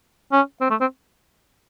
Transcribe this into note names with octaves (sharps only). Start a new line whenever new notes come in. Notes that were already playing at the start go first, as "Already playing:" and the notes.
C#4
C4
A3
C4